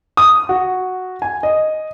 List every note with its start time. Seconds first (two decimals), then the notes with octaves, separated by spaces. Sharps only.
0.17 D#6
0.49 F#4
1.22 G#5
1.43 D#5